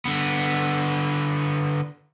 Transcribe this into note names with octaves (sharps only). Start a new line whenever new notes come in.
D3 B3